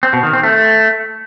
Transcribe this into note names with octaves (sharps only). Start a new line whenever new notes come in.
C4
B2
D#3
C4
A3